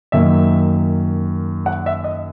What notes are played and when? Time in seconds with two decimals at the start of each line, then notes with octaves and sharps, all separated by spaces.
0.12 F#2 D#3 A#3 E5
1.66 F#5
1.86 E5
2.04 D#5